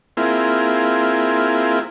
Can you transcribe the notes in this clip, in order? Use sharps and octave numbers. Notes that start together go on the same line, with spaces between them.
A#3 C4 E4 F4 G#4